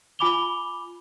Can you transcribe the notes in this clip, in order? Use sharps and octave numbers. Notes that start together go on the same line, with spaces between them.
F4 G#5 B5 D6 F7 G7